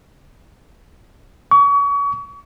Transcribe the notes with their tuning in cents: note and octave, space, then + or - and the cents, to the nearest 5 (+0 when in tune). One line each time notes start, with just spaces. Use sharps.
C#6 +35